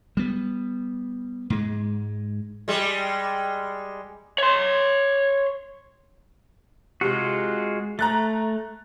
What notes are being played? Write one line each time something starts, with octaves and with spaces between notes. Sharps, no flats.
G3 B3
G#2 G#3
G3 G#3
C#5 C6
C3 G#3 F4 F#4
A3 A#5 F#6 A6